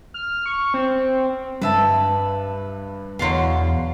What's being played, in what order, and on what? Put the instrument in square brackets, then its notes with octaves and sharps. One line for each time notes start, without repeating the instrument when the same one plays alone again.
[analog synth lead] F6
C#6
C4
[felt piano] G2 [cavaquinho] B4 E5 A5
[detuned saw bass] E2 [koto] B2 D3 F#3 [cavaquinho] F5 C6